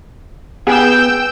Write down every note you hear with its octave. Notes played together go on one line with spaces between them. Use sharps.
B3 G#4 G5 E6 G6